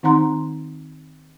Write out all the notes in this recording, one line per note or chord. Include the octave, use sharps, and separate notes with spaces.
D#3 C4 D#4 F#5 A#5 C6